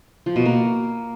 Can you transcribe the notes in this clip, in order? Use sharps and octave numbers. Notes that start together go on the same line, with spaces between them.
F3
B2
A#3